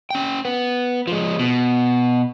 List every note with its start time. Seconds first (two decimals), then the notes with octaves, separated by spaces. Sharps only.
0.10 C#4 G5
0.45 B3
1.07 F3 G#3
1.39 B2